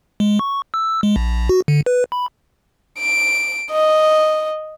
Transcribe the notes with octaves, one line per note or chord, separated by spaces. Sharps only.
G#3
C#6
E6
G#3
A#1
F#4
D3
B4
B5
D7
D#5